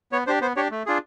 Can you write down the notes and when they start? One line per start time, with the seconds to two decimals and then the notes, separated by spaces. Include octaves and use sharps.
0.12 B3 C#5
0.27 D4 G4 C5
0.41 B3 C5
0.56 D4 G4 C#5
0.71 A3
0.86 D4 F4 G#4